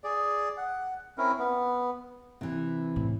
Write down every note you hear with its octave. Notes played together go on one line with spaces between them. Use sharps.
G#4 D5
F#5
C4 C#4 E4 A#4
B3
C3 E3
A2